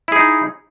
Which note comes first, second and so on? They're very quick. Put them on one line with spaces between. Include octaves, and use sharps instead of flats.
E4 G#4 D#4